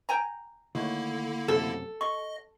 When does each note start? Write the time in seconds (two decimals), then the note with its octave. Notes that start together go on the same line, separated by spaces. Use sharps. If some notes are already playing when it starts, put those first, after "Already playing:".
0.09 G5 G#5 A#5
0.75 D3 D#3 A3 A#3 E4 C#5
1.48 F#2 C3 A3 A4
2.01 D#5 C6 C#6